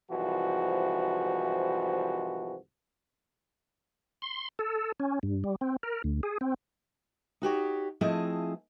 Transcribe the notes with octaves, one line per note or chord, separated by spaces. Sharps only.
C2 G#2 E3 F3 F#4
C6
A4
C#4
G2
G3
C4
A#4
D2
G#4
C4
D#4 F#4 G4 C#5
F3 A3 C4 E4 G#4 D#5